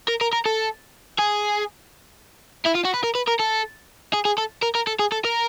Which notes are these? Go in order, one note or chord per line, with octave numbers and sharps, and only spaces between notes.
A#4
A#4
A#4
A4
G#4
E4
F4
F#4
B4
A#4
B4
A#4
A4
G#4
G#4
A4
A#4
A#4
A4
G#4
A4
A#4